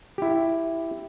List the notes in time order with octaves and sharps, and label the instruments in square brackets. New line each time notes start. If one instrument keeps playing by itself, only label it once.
[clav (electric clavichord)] E4 G4